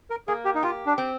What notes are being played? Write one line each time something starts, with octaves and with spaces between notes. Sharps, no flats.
A#4
A#3 G#4
G4
D#4
F4 G4
D4
C4